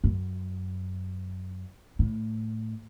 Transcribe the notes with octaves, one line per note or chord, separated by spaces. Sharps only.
F#2
A2